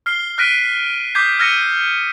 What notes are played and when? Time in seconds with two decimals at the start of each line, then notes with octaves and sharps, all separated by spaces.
0.06 F6 C7 G7
0.38 F6 F#6 A#6 B6 D7 D#7
1.15 D6 D#6 G6 G#6 B6 C7
1.39 E6 F6 G#6 A#6 C#7 D#7